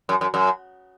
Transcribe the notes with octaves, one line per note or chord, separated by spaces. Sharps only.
F#2
F#2
F#2